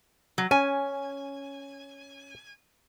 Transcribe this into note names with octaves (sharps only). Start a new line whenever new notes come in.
F#3
C#4 G#5